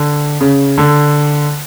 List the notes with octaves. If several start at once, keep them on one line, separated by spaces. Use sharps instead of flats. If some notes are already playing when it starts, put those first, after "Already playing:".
Already playing: D3
C#3
D3